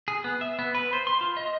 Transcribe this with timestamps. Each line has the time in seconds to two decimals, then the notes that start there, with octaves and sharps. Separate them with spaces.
0.08 G#4
0.24 B3
0.41 E5
0.59 B3
0.75 B4
0.93 C5
1.07 C6
1.21 F4
1.37 D#5